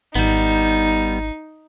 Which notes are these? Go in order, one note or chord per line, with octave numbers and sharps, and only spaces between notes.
G#1 G3 B3 D#4